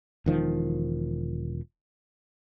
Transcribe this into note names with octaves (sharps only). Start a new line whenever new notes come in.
E1 D#3 F3